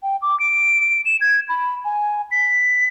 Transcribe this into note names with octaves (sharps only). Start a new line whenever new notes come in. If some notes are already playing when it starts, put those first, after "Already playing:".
G5
D6
D7
E7
G#6
B5
G#5
B6